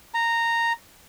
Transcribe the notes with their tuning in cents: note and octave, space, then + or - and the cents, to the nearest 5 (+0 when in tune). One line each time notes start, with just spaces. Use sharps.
A#5 -10